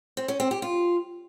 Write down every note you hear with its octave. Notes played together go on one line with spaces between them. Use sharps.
C4
C#4
C4
G4
F4